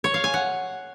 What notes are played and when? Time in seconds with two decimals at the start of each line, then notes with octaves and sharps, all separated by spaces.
0.04 C#5
0.14 F5
0.24 G#5
0.34 F#5